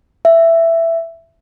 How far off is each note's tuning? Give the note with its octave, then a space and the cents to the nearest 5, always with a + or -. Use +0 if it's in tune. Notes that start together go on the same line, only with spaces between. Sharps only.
E5 +10